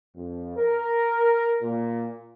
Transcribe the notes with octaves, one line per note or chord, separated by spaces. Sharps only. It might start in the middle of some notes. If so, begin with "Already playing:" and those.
F2
A#4
A#2